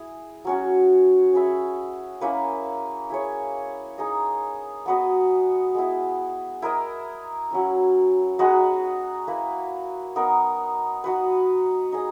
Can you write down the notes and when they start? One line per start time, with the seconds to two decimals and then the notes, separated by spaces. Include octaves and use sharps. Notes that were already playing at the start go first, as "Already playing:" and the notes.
Already playing: E4 G#4
0.45 F#3 C#4 F#4
1.33 C#4 G#4 B4 E5
2.21 A#3 C#4 E4 B4
3.10 E4 G#4 C#5
3.98 D#4 G#4 D#5
4.86 B3 F#4 B4 D#5
5.75 G#3 B3 E4
6.62 E4 A#4 D#5
7.51 F#3 C#4 E4
8.39 G#3 D#4 F#4 B4
9.27 A#3 E4 B4
10.16 B3 D#4 A#4
11.04 D#4 F#4 B4
11.92 D#4 G#4 D#5